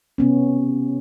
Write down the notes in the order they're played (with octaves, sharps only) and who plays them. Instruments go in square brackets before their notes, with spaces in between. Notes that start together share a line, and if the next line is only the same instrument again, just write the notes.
[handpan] C3 B3 C#4